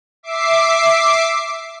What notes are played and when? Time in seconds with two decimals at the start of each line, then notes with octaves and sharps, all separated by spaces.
0.23 E5 D6 C7